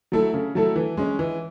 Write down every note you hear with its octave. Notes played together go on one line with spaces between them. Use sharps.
F#3 A3 E4 A4
C#3
F#3 A3 E4 A4
E3
G#3 C#4
E3